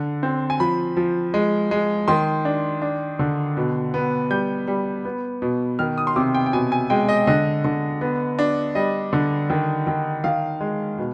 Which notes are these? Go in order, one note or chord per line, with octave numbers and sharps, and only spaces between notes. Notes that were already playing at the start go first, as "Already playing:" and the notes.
Already playing: D3
C4
G#5
F3 B5
F3
G#3
G#3
D#3 C6
D4
D4
D3
B2
B3
G3 G6
G3
B3
B2
D#3 F6
D#6
C6
C3 D6
G5
G5
B2 G#5
G#5
G#3 G5
D#5
D3 D#5
D3
B3
D4
G3 D#5
D3
D#3
D#3
D#3 F5
G#3
B2